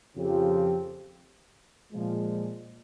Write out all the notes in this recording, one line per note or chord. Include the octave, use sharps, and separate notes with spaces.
F2 C#3 F3 C4 G4
A#2 F3 G#3